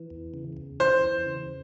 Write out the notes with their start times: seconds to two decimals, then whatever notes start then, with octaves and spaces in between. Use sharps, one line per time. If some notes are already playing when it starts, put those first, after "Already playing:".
Already playing: E3
0.10 E2
0.34 C#3
0.57 E2
0.80 E3 C5
1.03 E2
1.26 C#3